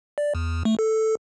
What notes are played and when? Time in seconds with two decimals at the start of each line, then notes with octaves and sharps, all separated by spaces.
0.18 D5
0.35 E2
0.65 A3
0.79 A4